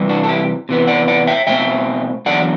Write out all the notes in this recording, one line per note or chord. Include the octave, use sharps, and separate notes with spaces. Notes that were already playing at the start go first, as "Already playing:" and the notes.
Already playing: C3 E3 G3
D4 F#4
A4
E4 G4
C3 E3 B3
D5 F#5
D5 F#5
E5 G5
B2 A3 C4 E5 G5
E2 D3 F#3 D5 F#5